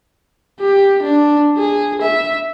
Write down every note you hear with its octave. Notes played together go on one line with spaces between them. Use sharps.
G4
D4
G#4
E5